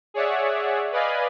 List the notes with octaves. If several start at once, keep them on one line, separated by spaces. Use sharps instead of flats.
G#4 C#5 D5 E5 F#5
B4 D5 D#5 F5 G#5 B5